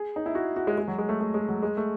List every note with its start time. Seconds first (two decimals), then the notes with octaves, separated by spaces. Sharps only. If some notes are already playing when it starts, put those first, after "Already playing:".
Already playing: G#4
0.16 D#4
0.26 E4
0.35 F#4
0.56 F#4
0.67 G#3
0.78 G#3
0.88 F#3
0.98 G#3
1.09 A3
1.21 A3
1.34 G#3
1.49 F#3
1.63 G#3
1.77 A3